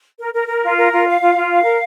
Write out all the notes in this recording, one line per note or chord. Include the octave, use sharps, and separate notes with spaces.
A#4
A#4
A#4
F4
A#4
F4
F5
F4
F4
F5
A#4